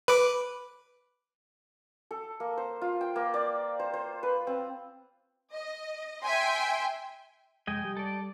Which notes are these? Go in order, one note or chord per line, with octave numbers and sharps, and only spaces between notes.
B4 D6
A4
A#3
C5
F4
G5
A#3
D5
C5
C5
B4
C4
D#5
E5 G5 G#5 C6
F1 F2 G#3 D#5 G5 G#5
G3
A4 D5